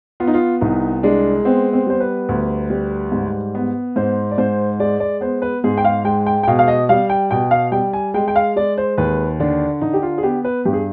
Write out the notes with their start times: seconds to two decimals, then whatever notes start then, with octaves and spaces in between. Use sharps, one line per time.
0.20 B3 F4
0.28 D#4
0.34 F4
0.61 C2 D#4
1.03 G#3 D4
1.45 B3 C4
1.73 C4
1.87 G3 C5
2.00 B4
2.29 D2
2.70 G3
3.12 G#2
3.55 B3
3.96 G#2 C5
4.31 D5
4.38 G#2 C5
4.80 G#3 D5
5.00 D5
5.21 B3 C5
5.42 B4
5.64 G#2 G#4
5.78 G5
5.85 F5
6.05 G#3 G5
6.26 G5
6.43 G5
6.48 B2 F5
6.59 F5
6.68 D#5
6.89 G3 F5
7.10 G5
7.31 B2 G5
7.51 F5
7.72 G3 G5
7.93 G#5
8.14 G#3 G5
8.28 G5
8.36 F5
8.56 G#3 D5
8.78 C5
8.98 D#2 B4
9.40 D3 D4
9.81 D3 D#4
9.93 G4
10.02 F4
10.18 G#4
10.23 B3 G4
10.44 B4
10.65 G2 G4
10.73 G#4